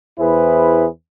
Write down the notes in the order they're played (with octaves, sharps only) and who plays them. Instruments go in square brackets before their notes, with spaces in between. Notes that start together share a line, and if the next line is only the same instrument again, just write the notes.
[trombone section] E2 E4 G#4 B4 C5